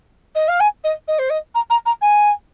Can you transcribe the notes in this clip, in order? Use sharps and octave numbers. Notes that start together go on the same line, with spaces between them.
D#5
F5
G#5
D#5
D#5
C5
D#5
A#5
A#5
A#5
G#5